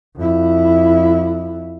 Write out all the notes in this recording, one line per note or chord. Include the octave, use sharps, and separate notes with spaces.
F2 E4